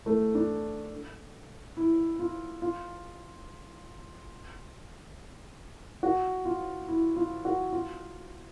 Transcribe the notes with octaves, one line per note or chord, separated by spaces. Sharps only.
A3
D4
E4
F4
F4
F#4
F4
E4
F4
F#4
F4